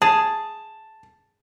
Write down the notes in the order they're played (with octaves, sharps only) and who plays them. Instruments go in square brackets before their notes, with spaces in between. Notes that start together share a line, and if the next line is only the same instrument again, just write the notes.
[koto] G#4 [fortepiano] A5